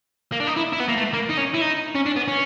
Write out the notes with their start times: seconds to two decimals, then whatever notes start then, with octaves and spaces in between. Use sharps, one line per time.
0.32 A#3
0.40 D4
0.47 D#4
0.57 E4
0.73 E4
0.80 B3
0.89 A#3
0.97 A3
1.14 A#3
1.30 D#4
1.38 C#4
1.54 E4
1.62 D#4
1.95 C#4
2.06 D4
2.16 B3
2.28 C#4